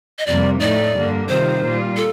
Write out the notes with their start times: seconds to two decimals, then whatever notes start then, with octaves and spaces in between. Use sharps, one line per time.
0.19 D#5
0.26 F2 C3 G3 A#3 D5
0.60 A2 A3 D#4 D5
0.94 G2 D3 G3 A#3
1.28 C3 D#3 G3 C4 F4 C5
1.63 A#2 G3 A#3 F4
1.97 A4